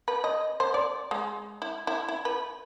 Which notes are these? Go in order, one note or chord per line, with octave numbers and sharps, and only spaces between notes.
B4
D#5
C5
D5
G#3
E4
E4
E4
B4